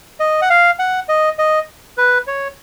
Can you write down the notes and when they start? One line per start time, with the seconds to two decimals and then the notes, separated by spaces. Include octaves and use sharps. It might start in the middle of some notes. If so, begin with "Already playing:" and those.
0.20 D#5
0.42 F#5
0.50 F5
0.79 F#5
1.09 D#5
1.39 D#5
1.98 B4
2.27 C#5